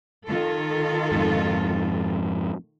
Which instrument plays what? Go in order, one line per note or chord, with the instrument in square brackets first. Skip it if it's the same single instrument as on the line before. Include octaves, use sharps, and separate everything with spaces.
[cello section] D#3 F4 A4
[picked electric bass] F2 G#2